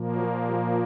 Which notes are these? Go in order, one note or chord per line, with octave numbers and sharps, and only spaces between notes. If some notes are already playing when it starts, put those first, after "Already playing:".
Already playing: A#2 F3 A#3
F#3 F#4
G3 G4